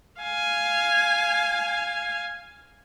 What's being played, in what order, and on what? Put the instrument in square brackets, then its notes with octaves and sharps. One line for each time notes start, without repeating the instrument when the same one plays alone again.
[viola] F5 G#5